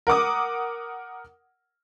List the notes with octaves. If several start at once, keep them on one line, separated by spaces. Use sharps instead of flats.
A#4 F#5 D6 D#6